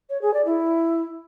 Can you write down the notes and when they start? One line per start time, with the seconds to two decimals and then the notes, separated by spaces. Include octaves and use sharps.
0.10 C#5
0.22 G#4
0.34 D5
0.46 E4